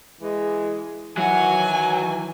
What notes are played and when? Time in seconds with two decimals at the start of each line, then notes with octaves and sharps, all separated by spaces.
0.22 E3 G#3
1.17 D#3 E3 F#3 F#4 G#5